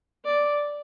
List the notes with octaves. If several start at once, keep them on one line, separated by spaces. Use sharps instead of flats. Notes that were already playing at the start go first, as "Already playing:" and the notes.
D5